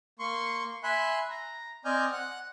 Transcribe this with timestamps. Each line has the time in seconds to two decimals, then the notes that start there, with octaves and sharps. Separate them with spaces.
0.19 A#3 C6 C#6
0.83 E5 G#5 B5 C6 F#6
1.31 A#5
1.85 C4 D5 D#5 G#5 F6 G6
2.12 F#5 F#6